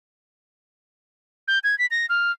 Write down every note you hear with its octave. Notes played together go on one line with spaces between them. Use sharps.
G6
G#6
B6
A#6
F6